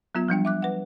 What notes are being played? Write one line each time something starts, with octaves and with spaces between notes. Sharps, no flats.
F#3 B3 F4 G#6
F3 G3 D4 G5
E5 D6 F#6
B4 F#5